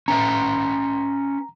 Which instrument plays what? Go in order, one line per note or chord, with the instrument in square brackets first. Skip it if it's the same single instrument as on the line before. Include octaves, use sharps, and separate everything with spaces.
[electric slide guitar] C#4 B4 E5 [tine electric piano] A#5